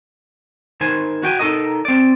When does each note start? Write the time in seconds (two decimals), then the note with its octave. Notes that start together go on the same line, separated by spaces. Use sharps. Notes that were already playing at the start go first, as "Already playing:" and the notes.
0.81 D#3 C5 G#5
1.23 F#4 G5 G#5
1.39 D#4 A4 A#4 D#5
1.85 C4 D5